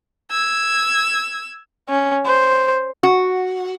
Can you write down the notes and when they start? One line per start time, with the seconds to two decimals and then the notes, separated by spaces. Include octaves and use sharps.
0.31 E6 G#6
1.89 C#4
2.26 C5
3.03 F#4